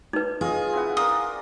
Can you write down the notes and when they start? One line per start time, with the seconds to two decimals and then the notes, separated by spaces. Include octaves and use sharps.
0.13 D#4 B4
0.41 F4 G#4 C#5 D#5
0.73 C4 E4 F#5
0.97 A#4 D5 F5 D#6